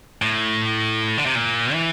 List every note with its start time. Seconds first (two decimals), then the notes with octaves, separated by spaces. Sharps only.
0.22 A2
1.18 D3
1.26 C3
1.35 A#2
1.73 E3